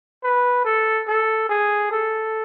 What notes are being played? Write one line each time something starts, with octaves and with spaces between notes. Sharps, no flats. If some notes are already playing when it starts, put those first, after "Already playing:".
B4
A4
A4
G#4
A4